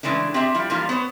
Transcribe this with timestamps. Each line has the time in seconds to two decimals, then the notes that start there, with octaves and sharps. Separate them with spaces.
0.03 C#3 E3 G#3 A3 D4
0.34 C4 G4 G#4 E5 A5
0.54 F3 G3 E4
0.70 E3 F3 G3 A#3 D#4 F4
0.89 B3 C5 C#5